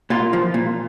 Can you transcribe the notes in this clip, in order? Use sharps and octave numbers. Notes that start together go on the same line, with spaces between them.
A#2 F4
F3
A#2